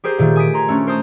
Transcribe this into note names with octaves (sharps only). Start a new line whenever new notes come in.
G4 G#4 A#4 C5
A#2 D#3 A3
G#5 D#6 B6 D7
A#5 C6 G#6
A3 C#4 D4
A#4 C5 A5 D#6